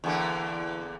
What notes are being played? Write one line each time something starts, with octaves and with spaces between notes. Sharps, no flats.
E2 D3 A#3